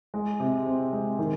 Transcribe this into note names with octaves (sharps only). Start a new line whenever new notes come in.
G#3
C3
C4
G#3
D#3